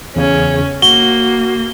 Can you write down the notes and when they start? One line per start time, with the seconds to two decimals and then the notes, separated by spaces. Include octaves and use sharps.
0.16 E2 C#3 C#4
0.82 A#3 F#4 G7